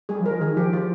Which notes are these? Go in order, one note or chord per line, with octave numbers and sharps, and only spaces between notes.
G3 G#4
F3
A#4
F3
D#3 G#4
F3 G4
F4